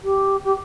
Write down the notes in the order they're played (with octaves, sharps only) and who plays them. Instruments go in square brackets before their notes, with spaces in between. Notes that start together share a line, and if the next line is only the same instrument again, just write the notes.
[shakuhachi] G4
G4